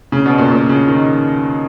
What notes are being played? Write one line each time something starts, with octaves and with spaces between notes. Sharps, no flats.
C#3
B2
A#2
A#2
C#3
D#3